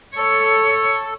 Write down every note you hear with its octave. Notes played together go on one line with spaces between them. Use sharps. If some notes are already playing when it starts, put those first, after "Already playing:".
A4 C#5